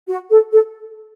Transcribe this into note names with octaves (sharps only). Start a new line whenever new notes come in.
F#4
A4
A4